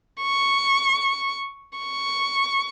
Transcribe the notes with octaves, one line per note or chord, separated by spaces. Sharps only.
C#6
C#6